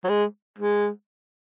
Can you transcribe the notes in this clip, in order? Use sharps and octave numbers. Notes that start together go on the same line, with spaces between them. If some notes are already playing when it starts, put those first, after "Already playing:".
F#3
G#3
G#3